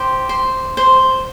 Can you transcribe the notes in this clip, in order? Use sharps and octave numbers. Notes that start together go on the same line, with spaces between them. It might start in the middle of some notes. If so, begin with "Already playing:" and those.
Already playing: G4 C5
C5
C5